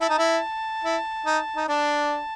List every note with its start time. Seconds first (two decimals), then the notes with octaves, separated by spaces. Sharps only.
0.01 E4 A5
0.09 D#4
0.18 E4
0.84 E4
1.26 D#4
1.56 D#4
1.68 D4 A5